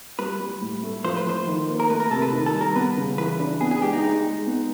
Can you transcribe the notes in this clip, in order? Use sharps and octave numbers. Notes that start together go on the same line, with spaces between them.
G3 B4
G3
A2
A3
F3 C5
B4
F3 C5
D#3
A#3
A#4
A3 B4
A#4
C3 A4
B4
D#3
A4
G3
A#4
B3 B4
C#3
E3 B4
D4
B3 G#4
G#4
G#3 G4
D#4
G#3 D#4
G#3
B3